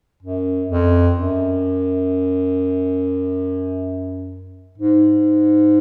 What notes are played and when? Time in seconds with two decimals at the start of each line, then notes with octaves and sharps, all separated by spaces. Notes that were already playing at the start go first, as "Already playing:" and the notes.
0.23 F#2
0.69 F2
1.15 F#2
4.78 G#2